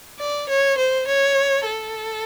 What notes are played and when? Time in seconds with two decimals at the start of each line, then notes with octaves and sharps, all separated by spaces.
0.20 D5
0.49 C#5
0.78 C5
1.07 C#5
1.66 A4